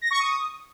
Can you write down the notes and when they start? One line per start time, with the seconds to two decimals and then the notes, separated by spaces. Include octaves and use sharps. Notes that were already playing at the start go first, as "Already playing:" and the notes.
0.02 A#6
0.11 C#6
0.20 D#6